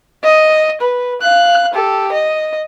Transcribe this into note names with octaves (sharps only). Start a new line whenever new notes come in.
D#5
B4
F5 F#6
G4 A4
D#5